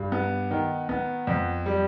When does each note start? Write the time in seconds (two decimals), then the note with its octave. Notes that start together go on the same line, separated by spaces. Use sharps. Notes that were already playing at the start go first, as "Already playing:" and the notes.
Already playing: G2
0.12 B3
0.51 D#3
0.89 B3
1.27 F2
1.66 G3